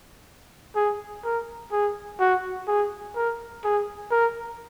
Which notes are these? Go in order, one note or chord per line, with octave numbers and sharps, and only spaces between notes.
G#4
A#4
G#4
F#4
G#4
A#4
G#4
A#4